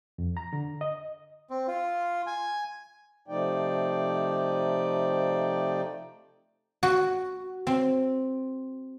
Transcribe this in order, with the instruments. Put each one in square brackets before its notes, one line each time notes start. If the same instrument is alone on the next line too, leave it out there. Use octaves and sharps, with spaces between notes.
[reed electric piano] F2
A#5
D3
D#5
[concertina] C4
F4
G#5
[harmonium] C3 F3 A3 D#4 D5 G5
[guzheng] F#4
C4